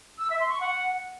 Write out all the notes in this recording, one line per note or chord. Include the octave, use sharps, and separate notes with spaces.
E6
E5
C6
C#6
F#5